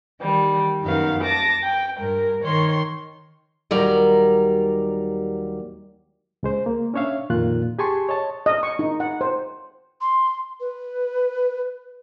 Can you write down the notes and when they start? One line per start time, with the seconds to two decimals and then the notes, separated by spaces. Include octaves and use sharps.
0.20 D#3 G3
0.83 F#2 D#3 B3 F5
1.23 A5 D6 A#6
1.63 G5
1.97 G2 A#4
2.43 D#3 C#5 C6
3.71 D#2 F#3 G3 A#4 D5 A#5
6.43 C#2 G#3 C5
6.66 A#3
6.94 C#4 D4 C#5 E5 F5
7.30 F2 A#2 D#3 F4 F#6
7.79 G4 G#4 G#5 A5 C6 C#6
8.09 C#5 D#5 A5
8.46 D#5
8.63 C#6
8.79 D#4
9.00 F#5
9.21 C5
10.01 C6
10.60 B4